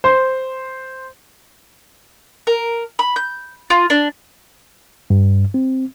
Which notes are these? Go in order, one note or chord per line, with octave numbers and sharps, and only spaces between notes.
C5
A#4
B5
G6
F4
D4
G2
C4